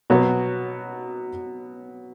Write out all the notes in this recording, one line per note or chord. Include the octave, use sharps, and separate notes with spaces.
B2 F#3 B3 F#4 C#5